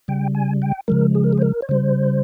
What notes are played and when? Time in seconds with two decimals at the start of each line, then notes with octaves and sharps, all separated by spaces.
0.08 C#3 G3 G5
0.35 G#5
0.62 G5
0.88 C#3 F3 G#3 A#4
1.15 G#4
1.24 A#4
1.33 G#4
1.38 C5
1.42 A#4
1.62 C#5
1.69 C#3 G3 C5